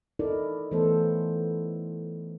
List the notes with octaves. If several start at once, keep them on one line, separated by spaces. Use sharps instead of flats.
D#4 E4 A4 A#4 D5
E3 A3 B3 A4 C5